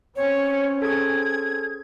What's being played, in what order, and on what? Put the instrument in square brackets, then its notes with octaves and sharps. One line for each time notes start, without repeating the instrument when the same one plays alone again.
[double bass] C4 C#4 [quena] C#5
[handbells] G#4 A4 [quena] G#6